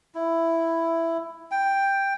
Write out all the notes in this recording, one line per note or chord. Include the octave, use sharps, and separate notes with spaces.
E4
G5